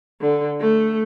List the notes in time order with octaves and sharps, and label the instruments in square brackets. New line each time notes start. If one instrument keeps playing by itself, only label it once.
[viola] D3
A3